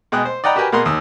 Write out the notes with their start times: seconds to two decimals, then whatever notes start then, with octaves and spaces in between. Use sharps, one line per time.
0.12 B2 G#3 G5 D#6 F#6
0.25 C5
0.44 D5 D#5 F#5 G5 A#5 B5
0.56 F#4 G4 A#4 B4 G5 G#5
0.72 B2 A#3 G#4 A#4 F#5 C6
0.85 D#2 D#6 E6